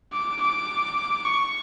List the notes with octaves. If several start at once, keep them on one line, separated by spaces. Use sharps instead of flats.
D6
D6
C#6